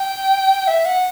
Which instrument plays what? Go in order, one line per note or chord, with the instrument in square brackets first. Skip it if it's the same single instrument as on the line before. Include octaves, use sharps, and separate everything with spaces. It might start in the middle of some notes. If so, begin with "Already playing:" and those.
Already playing: [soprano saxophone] G5
E5
F#5